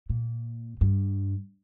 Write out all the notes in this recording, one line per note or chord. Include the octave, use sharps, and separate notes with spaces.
A#2
G2